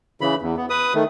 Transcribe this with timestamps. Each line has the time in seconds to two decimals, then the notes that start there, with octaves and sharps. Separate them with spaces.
0.21 C#3 E3 B5
0.42 E2
0.57 B3
0.70 B4 D#6
0.94 D#3 A3